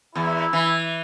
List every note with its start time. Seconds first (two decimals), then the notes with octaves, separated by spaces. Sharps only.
0.15 E2 E4
0.53 E3